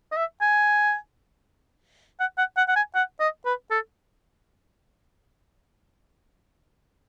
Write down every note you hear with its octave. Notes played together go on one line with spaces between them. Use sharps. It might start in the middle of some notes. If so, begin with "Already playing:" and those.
D#5
E5
G#5
F#5
F#5
F#5
F#5
G#5
F#5
D#5
B4
A4